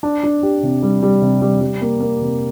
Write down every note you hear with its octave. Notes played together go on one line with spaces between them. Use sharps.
D4
D4
G4
C3
G3
G3
C3
G3
G3
A#3
A#3
C3